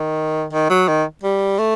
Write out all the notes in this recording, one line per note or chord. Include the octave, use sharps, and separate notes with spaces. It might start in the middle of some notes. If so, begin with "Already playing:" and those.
Already playing: D#3
D#3
F#3
D#3
G3
A3